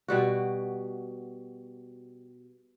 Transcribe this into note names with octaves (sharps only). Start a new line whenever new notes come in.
B2 G3 F#4